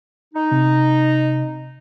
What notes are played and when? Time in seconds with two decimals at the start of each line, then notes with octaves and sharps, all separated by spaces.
0.34 D#4
0.51 C3